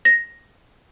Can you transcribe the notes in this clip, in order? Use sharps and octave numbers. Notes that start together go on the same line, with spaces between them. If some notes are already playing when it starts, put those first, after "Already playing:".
A#6